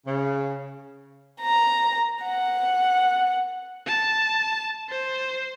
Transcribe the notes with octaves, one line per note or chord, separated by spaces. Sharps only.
C#3
A#5
F#5
A5
C5